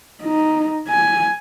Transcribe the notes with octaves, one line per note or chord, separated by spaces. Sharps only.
D#4
G#5